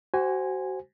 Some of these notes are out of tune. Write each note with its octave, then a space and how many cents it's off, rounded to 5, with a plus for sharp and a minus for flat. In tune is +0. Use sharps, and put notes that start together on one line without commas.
F#4 +30 C5 +0 G#5 -10